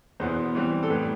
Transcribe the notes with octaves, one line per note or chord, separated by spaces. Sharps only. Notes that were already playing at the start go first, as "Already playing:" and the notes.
E2 B2 B3 E4 C5
E3 G3 C4
A4
A2 G3 B3 B4